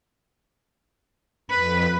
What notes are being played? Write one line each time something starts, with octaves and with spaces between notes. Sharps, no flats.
F2 B4